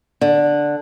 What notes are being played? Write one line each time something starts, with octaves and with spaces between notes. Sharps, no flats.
D3